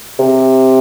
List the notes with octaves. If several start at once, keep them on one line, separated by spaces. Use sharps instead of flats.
C3